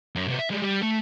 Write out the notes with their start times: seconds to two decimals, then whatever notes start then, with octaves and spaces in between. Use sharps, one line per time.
0.15 F#2
0.27 C3 B3
0.39 E5
0.50 G3 G#3
0.62 G3
0.82 A3 A4